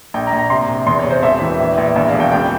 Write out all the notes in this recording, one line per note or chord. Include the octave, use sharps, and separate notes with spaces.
A#1 G5
A#5
A#1
A#5
C3 C6
C3
E2 C6
C#5
C3
C5
E1 E5
E3
A#1
A#1
E2 E5
F5
E1
G5
C#2 G5